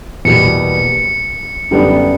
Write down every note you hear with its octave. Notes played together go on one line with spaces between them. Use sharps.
E2 B2 G3 A#3 C#7
F#2 D3 G3 B3 D4